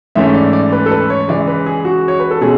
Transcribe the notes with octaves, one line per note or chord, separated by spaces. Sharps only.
G#2 E3 A3 C#4 E5
D5
D5
B4
A4
B4
C#5
C#3 E3 G#3 D5
B4
G#4
F#4
C#5
B4
A4
B2 G#3 C#4 G#4